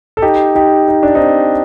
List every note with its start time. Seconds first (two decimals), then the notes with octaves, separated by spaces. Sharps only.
0.17 A4
0.22 D#4 G4
0.55 D#4 G4
0.88 D#4
1.03 D4
1.15 C4 D#4